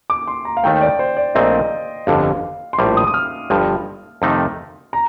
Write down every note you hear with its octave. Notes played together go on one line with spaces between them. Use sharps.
D6
C6
A#5
F5
D#2 D#3 A3 G5
D5
C5
D5
A#1 A#2 A3 C4 D#5
G1 F2 D3 F5
C6
A#1 A2 G3 D6
D#6
D#6
F6
G1 G2 F3
F2 C3 D#3 A3 D#4
A#5